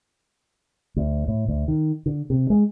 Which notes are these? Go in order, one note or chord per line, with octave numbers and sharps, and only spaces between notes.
D2
A2
D2
D#3
D3
C3
G#3